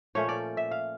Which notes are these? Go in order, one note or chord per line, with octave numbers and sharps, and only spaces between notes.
A#2 F3 A3 C#4 C#5
D5
E5
F5